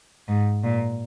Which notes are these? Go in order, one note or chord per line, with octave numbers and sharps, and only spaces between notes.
G#2
A#2